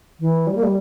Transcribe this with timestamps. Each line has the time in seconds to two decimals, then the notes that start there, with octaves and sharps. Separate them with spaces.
0.20 E3
0.47 G3
0.55 A#3
0.63 G3